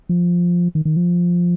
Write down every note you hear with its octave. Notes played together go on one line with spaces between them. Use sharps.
F3
D#3
D#3
F3